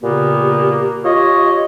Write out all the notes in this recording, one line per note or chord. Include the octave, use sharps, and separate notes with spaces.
A#2 C#3 A#3 B3 G4
F4 G4 C#5 D#5